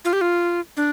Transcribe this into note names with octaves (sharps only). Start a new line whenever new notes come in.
F4
G4
F4
D4